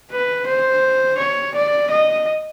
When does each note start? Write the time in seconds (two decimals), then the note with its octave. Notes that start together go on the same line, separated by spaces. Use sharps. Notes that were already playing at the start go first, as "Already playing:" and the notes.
0.11 B4
0.47 C5
1.19 C#5
1.55 D5
1.90 D#5